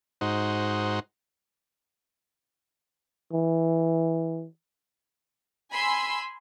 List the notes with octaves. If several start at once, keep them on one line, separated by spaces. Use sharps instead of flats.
G#2 D#4 F#4 C5
E3
G#5 B5 C6 E6